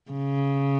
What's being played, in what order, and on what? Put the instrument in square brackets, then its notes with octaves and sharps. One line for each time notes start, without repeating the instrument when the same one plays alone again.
[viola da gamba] C#3